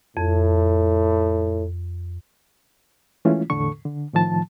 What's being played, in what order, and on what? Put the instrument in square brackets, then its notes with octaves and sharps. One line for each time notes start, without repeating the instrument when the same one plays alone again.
[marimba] F2 [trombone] A2
[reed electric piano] E3 G#3 A3 C#4 E4 F4
E2 A2 D3 A4 C#6
D3
A2 D#3 F3 A5